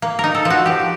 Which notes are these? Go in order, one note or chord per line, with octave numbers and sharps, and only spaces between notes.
A#3
D#4 A#4
A4
F3
F#4
F3 G4